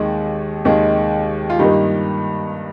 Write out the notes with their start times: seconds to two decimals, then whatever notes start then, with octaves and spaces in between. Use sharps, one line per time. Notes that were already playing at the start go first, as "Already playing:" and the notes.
Already playing: D#2 D#3 G#3
0.65 D#2 D#3 G#3
1.50 F4
1.59 G2 D#3 A#3 D#4 G4